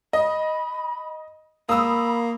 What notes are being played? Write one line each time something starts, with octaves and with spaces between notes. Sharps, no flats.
D#5 B5
A#3 B5 D#6 E6